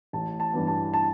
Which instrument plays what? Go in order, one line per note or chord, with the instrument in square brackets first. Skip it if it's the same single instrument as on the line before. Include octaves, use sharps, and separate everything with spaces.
[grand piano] A1 A5
A5
G2 E3 B3
A5
A5